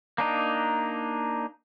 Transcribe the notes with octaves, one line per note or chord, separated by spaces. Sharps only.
A#3 D4 D#4